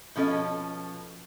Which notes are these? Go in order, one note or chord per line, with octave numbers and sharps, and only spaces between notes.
B2 F3 C#4 A4 D#5